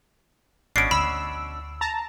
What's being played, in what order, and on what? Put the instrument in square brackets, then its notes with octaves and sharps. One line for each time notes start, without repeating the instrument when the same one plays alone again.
[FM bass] G#1 [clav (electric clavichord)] B2 C#4 D4 [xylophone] C7 D7
[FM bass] D2 [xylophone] B5 [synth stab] E6
[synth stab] A5 A#5